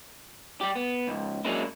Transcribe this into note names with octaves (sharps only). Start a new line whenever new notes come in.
G3 G4
B3
C#2 G#2
F#3 G#3 A#3 C#4 D4 E4